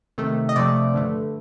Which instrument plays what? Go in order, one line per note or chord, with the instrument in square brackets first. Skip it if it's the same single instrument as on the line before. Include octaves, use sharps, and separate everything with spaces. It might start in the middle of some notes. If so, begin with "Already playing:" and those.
[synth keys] C3 D#3 A3
D#5
C3 F3 A3 D5
G2 D3 A3